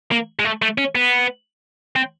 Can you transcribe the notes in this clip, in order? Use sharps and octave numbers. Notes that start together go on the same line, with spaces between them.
A#3
G#3
A3
A3
C#4
B3
C4